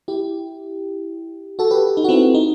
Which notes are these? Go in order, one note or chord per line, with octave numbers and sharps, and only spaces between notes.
E4 G4
F#4 A4
G4 B4
D#4
F#4
C4 E4
D#4